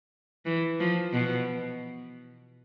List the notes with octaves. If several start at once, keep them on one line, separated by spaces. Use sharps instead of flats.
E3
F3
B2